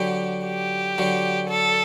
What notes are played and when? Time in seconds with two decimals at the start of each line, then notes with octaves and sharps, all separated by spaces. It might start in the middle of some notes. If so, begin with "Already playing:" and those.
Already playing: D3 F#3 G4
0.46 G4
0.98 D3 F#3
1.50 A4